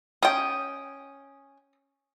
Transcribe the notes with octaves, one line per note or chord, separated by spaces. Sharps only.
C#4 G5 D#6